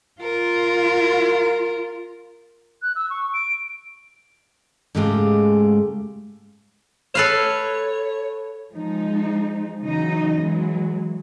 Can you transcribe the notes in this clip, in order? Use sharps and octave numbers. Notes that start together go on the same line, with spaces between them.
F4 A#4
F#6
E6
C#6
D7
G#2 C#3 G#3 A3 G4 F5
A4 B4 C#5 F5
F3 G#3 D#4
C#3 E3 F#3 D#4 D#5
E3 F#3 G#3